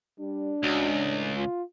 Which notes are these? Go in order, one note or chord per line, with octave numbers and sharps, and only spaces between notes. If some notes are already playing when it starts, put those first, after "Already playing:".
G3 D4
C#2 F#4
A2
F4